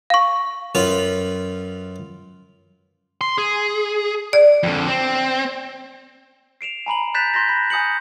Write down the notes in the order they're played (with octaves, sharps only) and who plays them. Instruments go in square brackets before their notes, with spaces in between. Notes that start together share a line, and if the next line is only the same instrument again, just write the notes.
[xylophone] F5 C#6
[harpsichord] F#2 F4 B4
[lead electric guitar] C6
G#4
[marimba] D5
[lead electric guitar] F2 D3
C4
[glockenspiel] C7 D7 E7 F7
G#5 A#5 B5 F#7
F#6 G6 A6 B6 E7 F7
C6 G6 A6 A#6
B5
G#5 D#6 G6 C#7 F#7